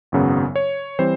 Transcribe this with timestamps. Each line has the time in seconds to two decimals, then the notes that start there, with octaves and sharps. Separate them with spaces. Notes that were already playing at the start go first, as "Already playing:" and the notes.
0.12 G#1 F#2 C#3 F#3 B3
0.56 C#5
0.99 E3 G3 C4 C5